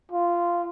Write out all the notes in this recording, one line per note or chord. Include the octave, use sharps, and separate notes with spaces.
F4